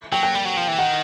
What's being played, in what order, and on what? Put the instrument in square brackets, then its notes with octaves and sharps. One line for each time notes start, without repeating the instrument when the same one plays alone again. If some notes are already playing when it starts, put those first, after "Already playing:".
[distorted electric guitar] F#3 [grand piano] G5
[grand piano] G5
[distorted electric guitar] G3
F#3
F3
E3
[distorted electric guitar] D#3 [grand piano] F#5